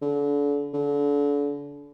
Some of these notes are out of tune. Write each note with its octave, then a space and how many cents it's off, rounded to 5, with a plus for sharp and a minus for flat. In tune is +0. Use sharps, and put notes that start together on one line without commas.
D3 -35
D3 -35